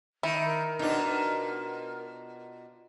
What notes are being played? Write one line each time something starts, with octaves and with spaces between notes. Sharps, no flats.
D#3 E4
A#4
B2 D4 D#4 F4